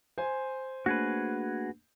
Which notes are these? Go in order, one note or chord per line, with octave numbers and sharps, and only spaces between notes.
C5 G#5
A3 A#3 D4 F#4 G#4 B4